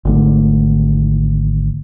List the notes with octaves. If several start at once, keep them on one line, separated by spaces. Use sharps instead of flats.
G#1 D3 A3